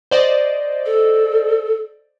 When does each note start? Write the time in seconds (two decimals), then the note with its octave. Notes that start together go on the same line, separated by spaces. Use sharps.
0.11 C5 D5 D#5
0.85 A4